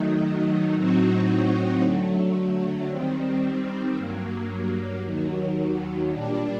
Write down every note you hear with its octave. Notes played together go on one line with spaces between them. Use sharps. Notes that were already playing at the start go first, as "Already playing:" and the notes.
Already playing: D#3 F#3 A3 D#4
A2 F#3 C4 D#4 F#4
D3 F#3 A3
D#3 G3 C4
G2 F#3 A#3
D#2 D#3 F#3
A#2 G3 D4